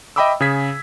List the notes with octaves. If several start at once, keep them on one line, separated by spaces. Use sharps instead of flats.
D#5 E5 G5 B5 D6 E6
C#3 G#4 G#6 B6